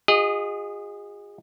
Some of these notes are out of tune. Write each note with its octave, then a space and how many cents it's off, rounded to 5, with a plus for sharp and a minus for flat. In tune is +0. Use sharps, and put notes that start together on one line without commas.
F4 +45 G#4 -30 D#5 +0